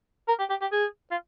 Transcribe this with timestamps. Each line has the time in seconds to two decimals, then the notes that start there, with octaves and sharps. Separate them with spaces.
0.28 A#4
0.39 G4
0.50 G4
0.61 G4
0.72 G#4
1.11 F4